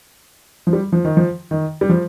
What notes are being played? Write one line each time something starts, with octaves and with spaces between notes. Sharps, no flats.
F3
G3
F3
D#3
F3
D#3
G3
F3